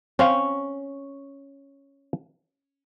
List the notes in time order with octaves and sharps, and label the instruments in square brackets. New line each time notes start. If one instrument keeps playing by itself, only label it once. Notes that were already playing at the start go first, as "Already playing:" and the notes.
[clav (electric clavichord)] C4 C5 F5 [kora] C#4